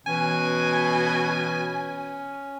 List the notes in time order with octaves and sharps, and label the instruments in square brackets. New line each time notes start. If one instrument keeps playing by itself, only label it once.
[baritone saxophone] B2 [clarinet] E3 [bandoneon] C#4 [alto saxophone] G#5